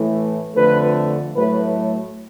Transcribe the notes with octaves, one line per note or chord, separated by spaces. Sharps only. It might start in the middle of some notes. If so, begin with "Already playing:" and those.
Already playing: A2 E3 A3
F2 D3 F3 A3 B4
A2 F#3 A3 B4